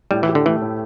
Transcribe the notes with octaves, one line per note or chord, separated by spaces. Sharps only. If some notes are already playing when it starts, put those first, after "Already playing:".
A2 G3
E3
G4
D3
E3 A3
A2